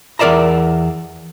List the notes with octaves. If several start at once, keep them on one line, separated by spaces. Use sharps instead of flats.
E2 A#4 D5 E5 A#5